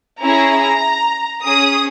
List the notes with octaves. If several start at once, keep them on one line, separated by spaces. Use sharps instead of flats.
C#4 E4 G#4 A#5
C#4 G#4 D#6